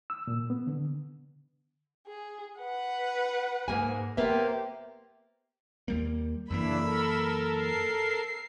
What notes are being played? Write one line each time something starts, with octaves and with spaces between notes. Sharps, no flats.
E6
A#2
B3
D3
G#4
B4 F#5
G#2 A#3 G#5
A#3 B3 G4 C5 E5
D#2 G3 A#3
F#2 C#3 E3 A#3 D4 E4 B5 E6
A4 A#4
C7